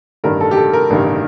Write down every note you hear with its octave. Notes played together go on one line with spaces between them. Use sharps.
A1 G2 D#3 A#4
A4
G4
A4
A#4
A1 G2 D#3